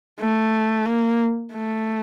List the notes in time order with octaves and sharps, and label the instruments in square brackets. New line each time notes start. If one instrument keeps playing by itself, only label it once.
[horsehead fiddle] A3
A#3
A3